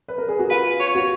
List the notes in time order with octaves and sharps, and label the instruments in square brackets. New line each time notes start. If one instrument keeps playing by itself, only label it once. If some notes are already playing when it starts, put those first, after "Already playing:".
[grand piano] B4
A#4
G#4
F#4
[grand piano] F4 [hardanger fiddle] B4
[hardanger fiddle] C#5
[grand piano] F#4